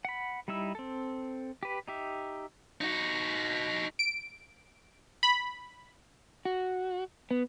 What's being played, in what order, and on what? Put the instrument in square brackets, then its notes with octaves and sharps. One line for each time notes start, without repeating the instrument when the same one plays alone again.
[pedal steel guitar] F#5 B5
G3 D#4 E4 E6
C4 A4
G4 B4
D#4 G4 E5
[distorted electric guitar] D#4 F#4
[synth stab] D7
B5
[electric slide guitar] F#4
B3